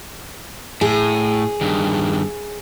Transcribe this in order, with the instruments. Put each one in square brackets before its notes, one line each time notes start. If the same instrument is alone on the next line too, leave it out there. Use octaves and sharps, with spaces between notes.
[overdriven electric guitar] A2 [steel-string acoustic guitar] G#4
[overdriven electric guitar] G2 D#3